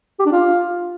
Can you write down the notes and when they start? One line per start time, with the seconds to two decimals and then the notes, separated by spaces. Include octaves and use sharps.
0.19 G4
0.26 D4
0.32 F4